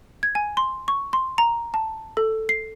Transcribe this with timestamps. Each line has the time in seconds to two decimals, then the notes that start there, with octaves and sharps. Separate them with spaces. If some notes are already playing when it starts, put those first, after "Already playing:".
0.23 G#6
0.35 G#5
0.57 C6
0.88 C#6
1.13 C6
1.38 A#5
1.74 A5
2.17 A4
2.49 C7